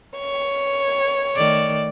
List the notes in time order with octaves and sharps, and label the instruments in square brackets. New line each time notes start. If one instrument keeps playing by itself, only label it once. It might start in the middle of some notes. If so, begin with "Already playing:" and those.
[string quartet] C#5
[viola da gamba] D#3 A3 D5